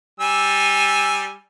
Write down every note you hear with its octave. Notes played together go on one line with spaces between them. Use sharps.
G3 G#5 E6